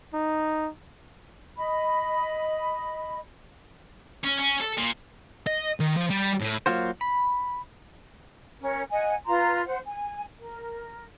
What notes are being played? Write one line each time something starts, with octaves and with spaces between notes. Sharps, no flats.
D#4
D#5 B5
C#4
C#4
A4
A#2
D#5
D#3
F3
G3
A2
F#3 A#3 F4 F#4 C5
B5
C#4 A#4
D#5 F#5 G#5
F4 B4 A#5 C6
C5 F#5
G#5
A#4